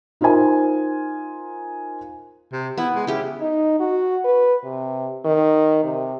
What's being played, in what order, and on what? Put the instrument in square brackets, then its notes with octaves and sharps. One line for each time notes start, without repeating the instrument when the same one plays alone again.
[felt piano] D#4 F4 A#4 C5 G#5
[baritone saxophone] C3
[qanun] B3 [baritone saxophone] E4
[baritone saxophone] G#3
[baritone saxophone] C#3 [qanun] E4 G4
[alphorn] D#4
F#4
B4
C3
D#3
C3